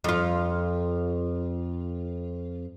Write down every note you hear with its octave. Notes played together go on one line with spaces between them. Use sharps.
F2 F4